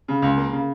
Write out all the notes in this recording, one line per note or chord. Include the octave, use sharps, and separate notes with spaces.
C#3
C#2
A#3
C#3